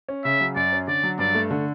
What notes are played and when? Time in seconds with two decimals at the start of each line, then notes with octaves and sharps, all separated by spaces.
0.09 C#4
0.24 C#3 E5
0.41 F#3
0.56 F#2 D5
0.72 C#4
0.88 D3 D5
1.03 F#3
1.19 G2 D5
1.35 A3
1.51 D3